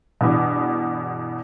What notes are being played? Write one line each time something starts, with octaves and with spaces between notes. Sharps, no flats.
E2 G2 B2